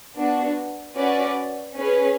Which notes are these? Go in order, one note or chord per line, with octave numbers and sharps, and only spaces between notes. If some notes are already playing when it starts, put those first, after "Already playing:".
B3 D4 F#4
C#4 F#4 B4 D5
C#4 G#4 B4